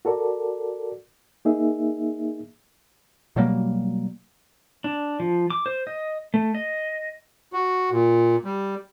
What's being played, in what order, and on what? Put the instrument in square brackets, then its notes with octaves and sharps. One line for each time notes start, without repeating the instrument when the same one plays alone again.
[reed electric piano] F#4 A4 A#4 D5
A#3 D#4 G#4 E5
[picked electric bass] B2 F#3 G3 A#3
[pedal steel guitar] D4
F3
D6
C5
D#5
A3
D#5
[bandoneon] F#4
A#2
G3